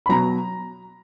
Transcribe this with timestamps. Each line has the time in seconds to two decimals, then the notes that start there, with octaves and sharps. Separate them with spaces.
0.06 B5
0.09 B2 F#3 A#5